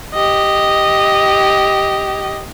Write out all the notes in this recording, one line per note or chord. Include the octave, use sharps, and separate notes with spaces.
G4 D#5